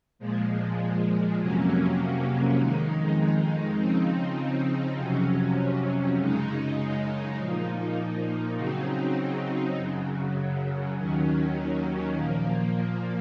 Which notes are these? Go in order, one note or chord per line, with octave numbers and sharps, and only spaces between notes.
A#2 F3 G#3
F2 C3 F#3 A#3 C#4
F2 D#3 G#3 D#4
C#3 F3 C4 D#4
F2 C3 F#3 C#4
F#2 C#3 G#3 D#4
A#2 F3 A#3 D#4
C#3 F#3 C4 D#4
F#2 C#3 F#3
D#2 D#3 F#3 C#4
A#2 F3 A#3